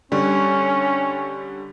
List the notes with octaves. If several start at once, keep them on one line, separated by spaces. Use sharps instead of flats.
D3 G3 C#4